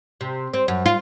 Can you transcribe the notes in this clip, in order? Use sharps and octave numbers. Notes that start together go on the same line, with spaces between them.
C3
C4
F#2
F4